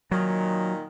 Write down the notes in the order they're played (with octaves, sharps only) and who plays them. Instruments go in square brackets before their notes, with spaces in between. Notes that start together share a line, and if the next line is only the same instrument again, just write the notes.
[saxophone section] A#2 D#3 [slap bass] F#3